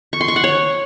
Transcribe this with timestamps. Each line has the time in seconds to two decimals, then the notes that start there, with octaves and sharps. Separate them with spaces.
0.13 C#6
0.21 C6
0.28 C#6
0.36 F#5
0.44 C#5